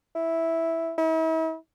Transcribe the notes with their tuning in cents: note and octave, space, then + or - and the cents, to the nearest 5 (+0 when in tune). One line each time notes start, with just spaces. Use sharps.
E4 -5
E4 -45